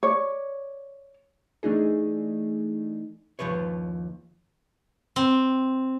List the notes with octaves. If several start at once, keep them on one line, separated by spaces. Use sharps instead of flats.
C#5 D5
E3 A3 D4 D#4 G#4
D#2 B2 F3 B4 C#5
C4